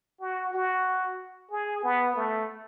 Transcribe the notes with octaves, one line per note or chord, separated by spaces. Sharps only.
F#4
F#4
G#4
B3
A3